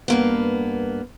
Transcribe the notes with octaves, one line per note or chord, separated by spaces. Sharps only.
G2 A#3 B3